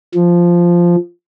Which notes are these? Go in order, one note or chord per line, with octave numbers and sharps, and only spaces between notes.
F3